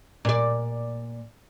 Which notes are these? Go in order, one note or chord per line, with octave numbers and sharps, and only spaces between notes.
A#2 D5